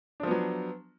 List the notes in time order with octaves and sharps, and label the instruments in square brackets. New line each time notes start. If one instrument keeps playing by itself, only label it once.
[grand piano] D4
F3
B3
F#3